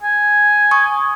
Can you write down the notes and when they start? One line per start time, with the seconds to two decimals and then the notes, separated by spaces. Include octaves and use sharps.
0.02 G#5
0.71 C#6 D#6